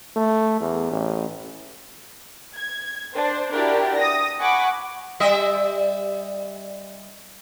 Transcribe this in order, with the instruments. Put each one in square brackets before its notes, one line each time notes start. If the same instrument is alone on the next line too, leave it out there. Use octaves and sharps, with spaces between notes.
[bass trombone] A3
E2
A1
[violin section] G#6
D4 C5
D4 E4 F#4 G4 A#4
D#6 A#6
F#5 G#5 B5 C#6 D6
[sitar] G3 D#5 E5